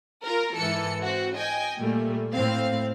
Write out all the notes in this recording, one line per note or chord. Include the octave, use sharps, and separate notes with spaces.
F4 A#4
G#2 E3 A4 C#7
C4 F#4
D#5 G5 G#5
A#2 G3 A3 A#3
A2 C4 F5